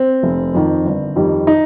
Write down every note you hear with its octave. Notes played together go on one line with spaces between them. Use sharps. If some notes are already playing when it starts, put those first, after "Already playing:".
Already playing: C4
F1
F2 D#3
G1
F2 D#3 G3
D#4